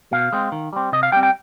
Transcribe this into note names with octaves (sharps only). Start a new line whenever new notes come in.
B2 F5
G#3 C4
D#3
G3 C4
C3 D#5
F5
G3 C4 G5
G5